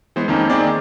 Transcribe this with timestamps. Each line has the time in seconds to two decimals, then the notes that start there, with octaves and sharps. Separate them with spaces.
0.16 E3 G#3 B3 C5
0.28 F2 D#3 A#3 C4 C#4
0.50 D#3 A#3 C4 G#4 D5